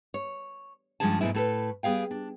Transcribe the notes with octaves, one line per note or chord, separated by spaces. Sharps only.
C#5
G2 F3 G#3 C#4 G#4 A5
G#2 B2 F#3 G#3 A3 E4
A2 A4 B4
G3 B3 G#4 F5 G5
D4